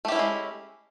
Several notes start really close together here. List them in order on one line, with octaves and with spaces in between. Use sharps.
A3 G4 E4 C#4 G#3